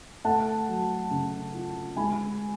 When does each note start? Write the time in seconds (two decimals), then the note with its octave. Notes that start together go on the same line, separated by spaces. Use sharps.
0.24 A3 F#5 A5
0.68 F#3
1.11 C#3
1.54 F4
1.96 G#3 G#5 B5